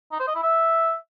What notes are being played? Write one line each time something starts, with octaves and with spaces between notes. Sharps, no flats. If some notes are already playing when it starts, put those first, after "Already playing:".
D#4
C5
D#5
E4
E5